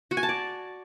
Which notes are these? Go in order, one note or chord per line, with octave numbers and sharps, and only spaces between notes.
F#4
G#5
A5
D5